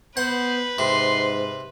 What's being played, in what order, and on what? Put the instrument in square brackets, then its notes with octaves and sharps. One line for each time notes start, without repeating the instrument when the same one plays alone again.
[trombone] B3 [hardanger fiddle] B4 [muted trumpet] C5 [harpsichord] F#5
[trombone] G#2 [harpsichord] C3 [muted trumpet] C6